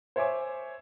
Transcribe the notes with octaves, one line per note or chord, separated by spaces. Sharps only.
C5 C#5 E5 G#5 D6